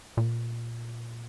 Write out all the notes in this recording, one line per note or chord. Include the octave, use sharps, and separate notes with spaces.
A#2